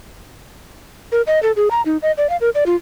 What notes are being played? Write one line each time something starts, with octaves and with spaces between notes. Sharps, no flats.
A#4
D#5
A4
G#4
A#5
D#4
D#5
D5
F5
A#4
D5
F4